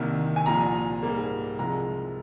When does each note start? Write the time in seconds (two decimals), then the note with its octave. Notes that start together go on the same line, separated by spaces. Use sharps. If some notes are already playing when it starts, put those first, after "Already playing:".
Already playing: C2 C3 D#3 A#3
0.36 G#5
0.46 C2 A#2 F3 A#5
1.03 G#2 G3 A#3
1.59 C2 C3 F3 G#3 A#5